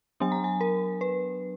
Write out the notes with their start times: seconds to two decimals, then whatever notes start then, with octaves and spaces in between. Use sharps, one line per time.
0.20 F#3 B3 D4 G#5
0.32 A#5
0.44 G#5
0.61 A#4
1.01 B4